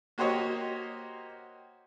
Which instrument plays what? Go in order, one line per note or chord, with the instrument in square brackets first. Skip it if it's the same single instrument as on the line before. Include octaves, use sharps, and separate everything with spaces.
[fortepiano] A#3 F#4 G4 C5 C#5 D#5